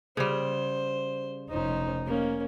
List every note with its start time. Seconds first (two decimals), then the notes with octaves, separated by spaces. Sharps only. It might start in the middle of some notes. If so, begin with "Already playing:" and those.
0.17 C#3 G3 C5
1.51 F1 C#4 D#4 C5
2.06 A#3 C#4